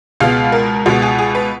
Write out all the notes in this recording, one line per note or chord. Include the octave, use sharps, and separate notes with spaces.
C#2 B2 G#3 B3 F5
A#4
C#2 B2 G#3 B3 F#4
G#4
G#4
B4